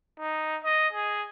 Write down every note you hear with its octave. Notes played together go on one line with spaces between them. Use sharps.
D#4
D#5
G#4